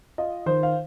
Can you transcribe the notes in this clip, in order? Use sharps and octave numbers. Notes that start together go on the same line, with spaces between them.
F4 D#5
D#3 C5
F5